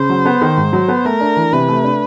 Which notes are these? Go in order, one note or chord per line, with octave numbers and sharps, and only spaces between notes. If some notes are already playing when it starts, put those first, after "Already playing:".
Already playing: C#3 C5
F#3
B3
D#3
G#2
F#3
B3
A3 A#4
D4
E3
C3 B4
A3
D4